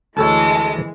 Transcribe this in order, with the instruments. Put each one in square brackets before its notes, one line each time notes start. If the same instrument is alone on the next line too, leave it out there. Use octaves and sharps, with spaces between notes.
[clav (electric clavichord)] D2 A4 C#5 [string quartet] E3 G#3 [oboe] A5